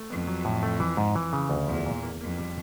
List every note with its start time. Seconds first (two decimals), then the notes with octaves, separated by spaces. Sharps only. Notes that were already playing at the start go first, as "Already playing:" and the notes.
Already playing: A3
0.10 F2 B3
0.27 F#3
0.45 A2
0.63 A3
0.80 E3
0.97 G#2
1.15 E3
1.33 C#3
1.50 D2
1.67 E2 F3
1.86 A#2
2.02 A#3
2.20 F2 A#3
2.38 G3